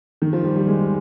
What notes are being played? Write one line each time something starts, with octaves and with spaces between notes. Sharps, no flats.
D#3
F3
G3
G3
G#3